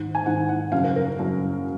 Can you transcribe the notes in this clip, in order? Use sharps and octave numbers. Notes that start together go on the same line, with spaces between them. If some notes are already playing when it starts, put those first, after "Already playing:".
Already playing: G#2 D#3
G#5
G#2 D#3 F#5
F#5
F#2 C#3 F5
A#4
A#4
F#2 C#3